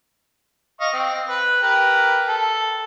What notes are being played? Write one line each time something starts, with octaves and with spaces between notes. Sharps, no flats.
D#5 F5 C#6
C4
B4
G4 A#4 B4
A4